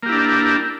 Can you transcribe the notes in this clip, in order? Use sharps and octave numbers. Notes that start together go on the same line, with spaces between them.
A#3 D4 E4 G4